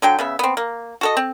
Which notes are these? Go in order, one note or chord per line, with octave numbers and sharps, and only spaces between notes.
D3 F#3 G5
C#3 B3 E5
B3 C4
A#3
F#4 A4 D#5
C4